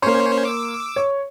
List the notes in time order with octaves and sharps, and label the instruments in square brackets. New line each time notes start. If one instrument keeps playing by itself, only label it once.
[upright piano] A#3 C6 [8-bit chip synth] C#4 C5 C#5
[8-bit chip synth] D6 E6
[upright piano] C#5